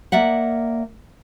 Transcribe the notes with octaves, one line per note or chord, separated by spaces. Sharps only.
A#3 D5 E5 F#5